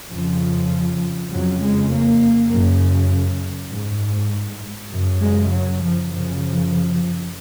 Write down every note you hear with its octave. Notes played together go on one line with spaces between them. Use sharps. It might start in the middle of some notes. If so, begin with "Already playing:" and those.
F2 C#3 F3
F2 C#3 F#3
G#3
A#3
F#2 C#3
G#2
F#2 C#3
G#3
F#3
F3
F#2 C#3 F3